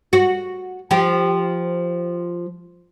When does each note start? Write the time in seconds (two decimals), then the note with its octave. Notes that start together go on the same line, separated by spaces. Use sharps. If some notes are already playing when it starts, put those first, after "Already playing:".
0.13 F#4
0.91 F3 G4